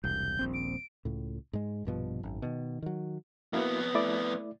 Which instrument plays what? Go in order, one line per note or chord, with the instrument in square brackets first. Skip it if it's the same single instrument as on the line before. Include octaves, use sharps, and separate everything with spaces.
[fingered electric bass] E1 C2 [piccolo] G6
[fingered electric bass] D#1 A#1 C4
[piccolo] D7
[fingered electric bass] C#2 A2
G#2 G#3
A#1 G2 B2 F3
G#1 F#2
B2 D#3
D#3 F#3
[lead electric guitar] F2 B3 [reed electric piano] A#3 E4 F#4
[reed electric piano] A3 E4 D5